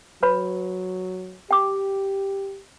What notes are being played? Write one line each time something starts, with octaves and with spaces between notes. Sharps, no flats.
F#3 B4 C#5 B5
G4 G5 D6